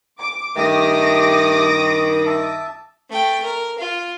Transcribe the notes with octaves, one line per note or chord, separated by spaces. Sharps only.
D6
G2 D#3 A3 G4 D6 D#6 A#6
E5 A5
A3 G5
A#4
F4